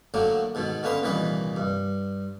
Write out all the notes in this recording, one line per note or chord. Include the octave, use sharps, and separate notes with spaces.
A2 D3 F#3 A#3 D4
G#2 B2 D#3
D3 A#3 C#4 B4 C6 D#6
C2 A#2 D#3 E3 B4 D#5
G2